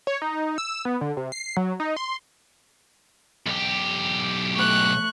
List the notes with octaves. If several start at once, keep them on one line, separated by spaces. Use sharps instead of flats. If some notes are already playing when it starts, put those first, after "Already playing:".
C#5
D#4
E6
B3
D3
C3
C7
F#3
D#4
C6
B1 G4
A3 C#6 F#6